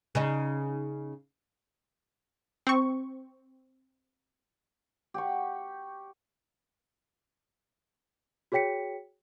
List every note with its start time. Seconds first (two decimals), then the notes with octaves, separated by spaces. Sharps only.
0.15 C#3 D#4
2.67 C4 C#6
5.14 G4 F#5 C#6
8.52 F#4 G#4 C#5 G5 B6 C#7